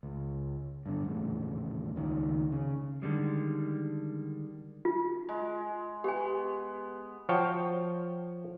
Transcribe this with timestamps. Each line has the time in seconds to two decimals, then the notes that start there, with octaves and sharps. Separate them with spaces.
0.03 C#2
0.86 G2 D3
1.05 D#1 E2 A2 C#3
1.96 C#2 D#3
2.52 C#3
3.02 D3 D#3 G3 G#3
4.85 F4
5.29 G#3
6.04 B3 G4 G#5
7.29 F3 F#4 C#5 G5 A5